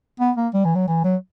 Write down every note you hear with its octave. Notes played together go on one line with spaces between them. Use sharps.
B3
A#3
G3
E3
F#3
E3
F#3